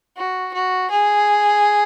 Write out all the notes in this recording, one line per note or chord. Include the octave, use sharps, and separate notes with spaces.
F#4
F#4
G#4